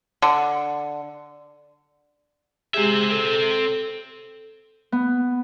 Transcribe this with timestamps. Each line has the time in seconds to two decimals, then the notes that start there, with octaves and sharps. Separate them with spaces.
0.22 D3
2.74 G#3 C4 G4 G#4 E5
3.11 A4
4.92 B3